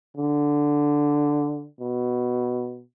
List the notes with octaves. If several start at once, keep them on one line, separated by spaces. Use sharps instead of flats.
D3
B2